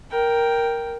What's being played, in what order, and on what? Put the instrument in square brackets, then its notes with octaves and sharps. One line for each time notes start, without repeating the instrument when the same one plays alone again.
[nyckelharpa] A#4 G5